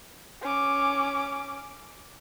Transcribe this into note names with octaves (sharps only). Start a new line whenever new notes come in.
C#4 D6